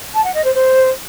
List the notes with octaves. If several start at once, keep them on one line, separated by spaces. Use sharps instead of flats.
A5
F#5
D#5
C5
C5